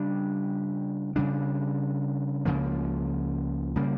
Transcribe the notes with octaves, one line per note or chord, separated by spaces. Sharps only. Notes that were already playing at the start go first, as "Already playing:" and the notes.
Already playing: C#3 G3 D4
C#3 G3 D4
C#2 C#3 F3 A#3
C#3 G3 A#3